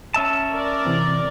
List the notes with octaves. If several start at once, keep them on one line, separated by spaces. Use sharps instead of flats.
C#4 E5 A5
A#4 D5
C3 E3 C4